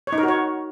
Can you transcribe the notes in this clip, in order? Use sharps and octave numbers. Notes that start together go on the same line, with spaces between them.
C#5
D#4
A#4
F#4
C#5